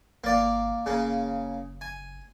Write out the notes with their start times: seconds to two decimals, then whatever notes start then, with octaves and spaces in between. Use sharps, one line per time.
0.24 G#1 A#3 D5 F5
0.86 F#1 C#3 A#3
1.81 G#5